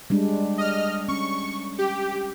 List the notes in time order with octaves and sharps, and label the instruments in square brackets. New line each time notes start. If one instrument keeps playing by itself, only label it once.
[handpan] G3 G#3 D4
[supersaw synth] D#5 F6
[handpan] C#4 [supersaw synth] C#6
[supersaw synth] G4